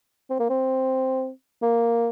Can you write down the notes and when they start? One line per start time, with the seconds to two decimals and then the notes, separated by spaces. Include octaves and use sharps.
0.30 C4
0.39 A#3
0.50 C4
1.63 A#3